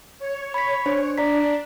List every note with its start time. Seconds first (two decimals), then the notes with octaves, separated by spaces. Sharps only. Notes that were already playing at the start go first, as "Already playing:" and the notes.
0.19 C#5
0.54 B5 B6
0.86 D4 C5
1.18 D4 D5 A#5 B6